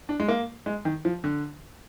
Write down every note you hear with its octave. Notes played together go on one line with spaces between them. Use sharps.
D4
G#3
A#3
G#3
D#3
F3
D3